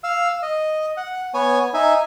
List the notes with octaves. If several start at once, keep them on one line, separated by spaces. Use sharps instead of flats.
F5 E6
D#5
F#5
B3 C#5 G#5
D#4 E5 G#5